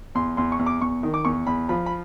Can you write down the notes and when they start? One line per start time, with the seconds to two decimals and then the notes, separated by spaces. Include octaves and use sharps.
0.15 E2 C6
0.37 E2 C6
0.52 C#6
0.59 E2
0.66 D6
0.81 E2 C#6
1.03 D#3
1.14 D6
1.25 E2 C#6
1.47 E2 B5
1.69 F3 B5
1.86 B5